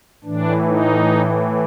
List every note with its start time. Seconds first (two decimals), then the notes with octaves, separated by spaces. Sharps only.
0.24 A2 E3 D4
0.65 D#4